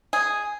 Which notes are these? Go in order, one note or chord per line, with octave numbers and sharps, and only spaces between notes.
G#4